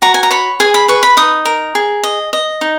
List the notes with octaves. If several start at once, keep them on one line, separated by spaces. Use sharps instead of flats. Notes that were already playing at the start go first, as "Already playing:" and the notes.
F#4 A#5
G#5
A#5
C#5 B5
G#4 G#5
B5
B4 C#6
B5
D#4 D#6
A#4
G#4
D#5
D#5
D#4